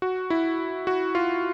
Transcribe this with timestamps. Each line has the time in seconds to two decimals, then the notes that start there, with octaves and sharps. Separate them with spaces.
0.02 F#4
0.30 E4
0.87 F#4
1.15 F4